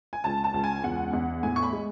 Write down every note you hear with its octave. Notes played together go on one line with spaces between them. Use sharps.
G#5
C#2 A5
A5
C#2
G#5
E2 F#5
E2
A2 G#5
C#6
B5
G#3